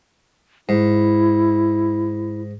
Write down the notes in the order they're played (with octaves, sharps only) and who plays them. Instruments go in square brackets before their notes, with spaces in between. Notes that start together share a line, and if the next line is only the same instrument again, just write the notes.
[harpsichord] G#2 [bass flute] E4